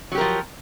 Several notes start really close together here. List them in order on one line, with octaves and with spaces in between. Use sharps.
F#3 G4 A#4 F3